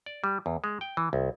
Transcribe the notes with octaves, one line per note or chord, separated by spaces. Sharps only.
D5
G3
E2
G#3
G5
E3
C2